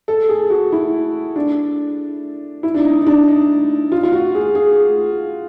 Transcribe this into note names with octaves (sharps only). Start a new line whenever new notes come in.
A4
G#4
F#4
E4
D4
E4
D4
D#4
D#4
D4
D#4
F4
F4
F#4
G#4
G#4